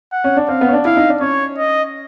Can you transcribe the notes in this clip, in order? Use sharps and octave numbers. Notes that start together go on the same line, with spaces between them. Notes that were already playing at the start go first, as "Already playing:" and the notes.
F#5
C#4
D4
C4 F5
B3
C#4
D4
E4 F5
D#4
D4
C#4 C#5
D#5